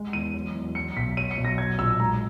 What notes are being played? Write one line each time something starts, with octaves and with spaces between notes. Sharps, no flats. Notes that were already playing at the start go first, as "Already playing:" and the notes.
Already playing: G#3
E2 D#7
F#3
E2
F#3 C#7
B1 B6
F#3 D#7
C#7
B1
A#6
F#3 G#6
A#1 E6
G#3 A#5